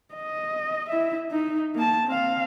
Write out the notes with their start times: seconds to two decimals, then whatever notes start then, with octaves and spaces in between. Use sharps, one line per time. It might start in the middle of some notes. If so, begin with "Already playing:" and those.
0.15 D#5
0.89 E4 E5
1.32 D#4
1.75 A#3 A5
2.07 C4 F5